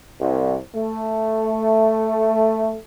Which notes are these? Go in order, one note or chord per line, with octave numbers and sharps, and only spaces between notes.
C2
A3